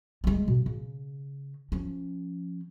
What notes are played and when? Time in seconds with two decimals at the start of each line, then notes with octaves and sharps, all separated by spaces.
0.24 G3 G#3
0.48 B2
0.66 C#3
1.72 F3 C#4